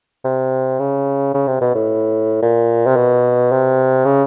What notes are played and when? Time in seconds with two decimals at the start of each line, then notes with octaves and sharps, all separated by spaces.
0.25 C3
0.79 C#3
1.34 C#3
1.47 C3
1.61 B2
1.75 A2
2.42 A#2
2.86 C3
2.96 B2
3.52 C3
4.05 C#3